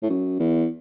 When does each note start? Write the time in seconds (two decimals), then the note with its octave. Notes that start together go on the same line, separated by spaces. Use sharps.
0.03 A2
0.09 F#2
0.39 E2